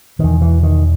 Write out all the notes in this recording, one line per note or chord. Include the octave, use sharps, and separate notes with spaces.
E2 B2 D#3
E3
D#3